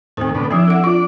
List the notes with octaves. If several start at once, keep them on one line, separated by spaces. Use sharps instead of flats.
D#2 A2 C4 C5
A2 D3 B3
F3 C4 D4 E4
A4 F#5
D4 F4 D5